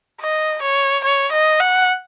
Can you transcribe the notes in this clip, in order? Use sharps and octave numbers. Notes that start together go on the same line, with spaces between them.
D#5
C#5
C#5
D#5
F#5